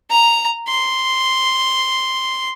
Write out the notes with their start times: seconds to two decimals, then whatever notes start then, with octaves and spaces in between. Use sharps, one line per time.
0.10 A#5
0.68 C6